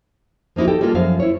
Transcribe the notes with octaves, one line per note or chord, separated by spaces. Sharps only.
F3 A#3 D#4 E4 F#4
G4 A4 G5
G3 G#3 A#3 F4 A4
F#2 F3 E5 F5
E4 C5 C#5